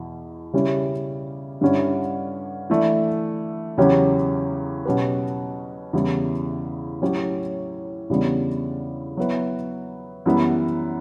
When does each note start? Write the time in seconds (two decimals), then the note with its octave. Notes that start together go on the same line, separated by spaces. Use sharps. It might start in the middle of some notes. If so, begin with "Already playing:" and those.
Already playing: E2 B2
0.53 C#3 G3 C#4 E4 G4
1.61 G2 D3 G3 C#4 E4
2.70 E3 A3 D4
3.78 E2 C#3 F#3 C#4 G4
4.85 B2 F#3 C#4 G4 B4
5.93 E2 C#3 E3 G3 B3
7.01 A2 F#3 C#4 G4 C#5
8.10 E2 C#3 G3 B3 D4
9.17 F#3 B3 E4 B4
10.26 F#2 E3 G3 B3